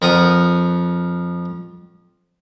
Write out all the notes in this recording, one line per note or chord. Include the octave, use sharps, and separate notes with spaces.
F2 A#4 F#5 D#6